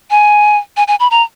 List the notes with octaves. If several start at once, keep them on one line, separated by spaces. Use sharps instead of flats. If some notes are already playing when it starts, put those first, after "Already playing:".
G#5
G#5
G#5
B5
A#5